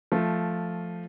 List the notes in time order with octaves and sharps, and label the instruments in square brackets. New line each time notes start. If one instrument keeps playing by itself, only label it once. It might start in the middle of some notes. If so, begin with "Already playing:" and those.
[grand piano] F3 A3